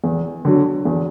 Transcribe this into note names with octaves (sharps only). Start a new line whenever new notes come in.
E2
D3 F#3
E2